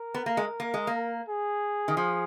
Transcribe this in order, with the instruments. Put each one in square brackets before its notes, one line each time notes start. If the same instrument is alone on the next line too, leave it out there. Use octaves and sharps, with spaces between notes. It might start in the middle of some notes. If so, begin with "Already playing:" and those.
Already playing: [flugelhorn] A#4
[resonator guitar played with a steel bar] B3
A#3
G#3
A#3
G#3
A#3
[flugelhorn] G#4
[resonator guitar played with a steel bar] D#3
F3